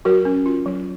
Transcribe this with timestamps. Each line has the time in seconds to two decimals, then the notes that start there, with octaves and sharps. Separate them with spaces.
0.05 F#3 F#4 A#4
0.25 C#4
0.46 F4
0.66 F#3